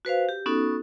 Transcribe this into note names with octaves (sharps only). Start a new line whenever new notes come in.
F#4 B4 C5 F5
G4
B3 C#4 D#4 F#4 A4